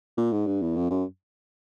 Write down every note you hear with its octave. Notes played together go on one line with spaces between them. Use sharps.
A#2
G#2
G2
E2
F2
F#2